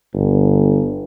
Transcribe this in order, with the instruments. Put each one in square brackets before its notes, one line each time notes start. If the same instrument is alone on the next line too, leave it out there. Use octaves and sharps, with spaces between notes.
[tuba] G1